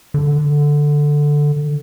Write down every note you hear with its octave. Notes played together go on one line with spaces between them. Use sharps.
D3